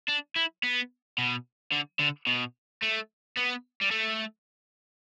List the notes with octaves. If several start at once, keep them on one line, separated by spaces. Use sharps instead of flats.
D4
E4
B3
B2
D3
D3
B2
A3
B3
G3
A3